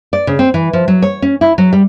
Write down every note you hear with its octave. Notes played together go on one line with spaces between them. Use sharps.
D5
C#3
C4
E3
F3
F#3
C#5
C#4
E4
F#3
G3